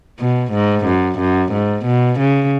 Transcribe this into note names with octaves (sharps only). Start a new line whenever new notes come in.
B2
G#2
F#2
F#2
G#2
B2
C#3